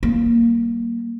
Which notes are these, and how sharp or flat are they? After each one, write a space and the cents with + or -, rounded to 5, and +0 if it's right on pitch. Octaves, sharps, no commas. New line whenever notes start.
G3 -30 A#3 +0